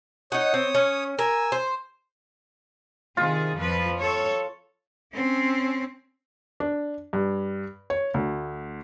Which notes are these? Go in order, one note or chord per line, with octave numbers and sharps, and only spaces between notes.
D#4 C#5 F#5 D#6
C4
C#4
A#4 G#5 E6
C5
C3 D#3 F4 G#4
F2 F3 B4
A4 C#5
C4 C#4
D4
G2
C#5
D2